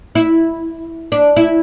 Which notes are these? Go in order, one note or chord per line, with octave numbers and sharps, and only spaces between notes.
E4
D4
E4